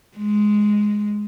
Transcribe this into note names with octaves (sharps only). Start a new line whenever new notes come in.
G#3